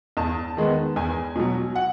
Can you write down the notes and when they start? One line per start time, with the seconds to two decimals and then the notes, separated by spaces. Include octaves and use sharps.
0.17 E2 A5
0.57 D#3 G#3 B3
0.96 E2 G#5
1.36 B2 F#3
1.76 F#5